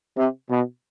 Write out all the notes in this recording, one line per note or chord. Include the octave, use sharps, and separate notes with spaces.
C3
B2